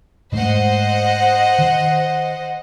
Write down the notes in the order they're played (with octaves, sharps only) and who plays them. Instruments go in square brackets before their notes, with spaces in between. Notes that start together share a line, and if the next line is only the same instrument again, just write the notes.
[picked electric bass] G#2 G#3 A3 [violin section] C5 D#5 F#5
[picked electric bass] D#3